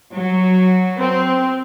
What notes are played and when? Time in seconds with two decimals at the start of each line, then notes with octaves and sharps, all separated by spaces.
0.14 F#3
0.98 C4